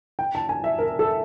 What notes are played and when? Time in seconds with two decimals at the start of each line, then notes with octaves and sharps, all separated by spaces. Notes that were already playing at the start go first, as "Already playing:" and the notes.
0.19 G5
0.35 A5
0.49 G#5
0.64 E5
0.79 A#4
0.99 A4